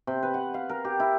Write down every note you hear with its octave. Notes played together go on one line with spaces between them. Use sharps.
C3
B4
F#5
F5
A#4
G4
E4